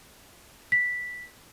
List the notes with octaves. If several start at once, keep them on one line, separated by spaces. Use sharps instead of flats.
B6